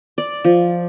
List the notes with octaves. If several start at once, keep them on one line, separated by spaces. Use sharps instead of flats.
D5
F3